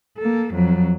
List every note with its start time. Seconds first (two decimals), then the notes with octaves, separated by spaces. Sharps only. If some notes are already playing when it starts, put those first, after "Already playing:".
0.18 A#3 A4
0.54 F2 F#3